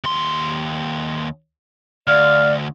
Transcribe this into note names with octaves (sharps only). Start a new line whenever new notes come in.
D#2 C6
D2 D5 F5